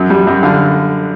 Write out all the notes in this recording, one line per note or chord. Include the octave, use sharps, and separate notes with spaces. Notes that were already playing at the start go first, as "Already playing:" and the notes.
Already playing: F#2 F#3
G3
F#2
D3 F5